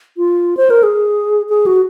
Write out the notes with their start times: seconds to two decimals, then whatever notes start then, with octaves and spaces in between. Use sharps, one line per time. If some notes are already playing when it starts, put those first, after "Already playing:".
0.17 F4
0.57 C5
0.70 A#4
0.83 G#4
1.49 G#4
1.66 F#4